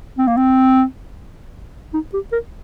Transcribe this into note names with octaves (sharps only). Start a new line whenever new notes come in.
C4
A#3
C4
D#4
G4
A#4